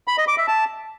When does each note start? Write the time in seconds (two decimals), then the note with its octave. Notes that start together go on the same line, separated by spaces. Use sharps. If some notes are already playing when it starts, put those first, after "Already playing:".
0.08 B5
0.18 D#5
0.28 D6
0.38 E5
0.48 A5